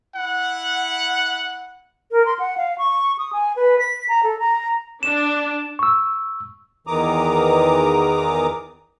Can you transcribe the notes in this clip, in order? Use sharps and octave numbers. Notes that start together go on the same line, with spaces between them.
E4 F#5
A#4
C6
F#5
F5
C#6
D#6
G#5
B4
B6
A#5
A4
A#5
D4 E7
C#6 E6
E2 D#3 E3 A#5 D6 D#6